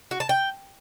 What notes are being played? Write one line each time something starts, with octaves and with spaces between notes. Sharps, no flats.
F#4
A5
G5